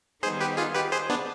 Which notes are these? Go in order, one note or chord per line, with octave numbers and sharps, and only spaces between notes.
D#3 G3 B3 D#4 G#4 C5
G4 B4
F4 G#4
G4 B4
G#4 C5
B3 D4